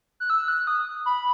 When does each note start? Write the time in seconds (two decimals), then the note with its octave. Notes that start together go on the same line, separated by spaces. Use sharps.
0.20 F#6
0.30 E6
0.48 F#6
0.67 D#6
1.06 B5